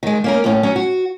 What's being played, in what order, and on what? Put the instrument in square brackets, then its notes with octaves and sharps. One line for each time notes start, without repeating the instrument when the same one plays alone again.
[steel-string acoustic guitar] D#3 G#3
A#3 C#4 A#4
D#2 A2 C#4
F#3 C#4
F#4